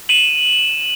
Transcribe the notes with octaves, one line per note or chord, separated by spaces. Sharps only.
D#7 E7 F#7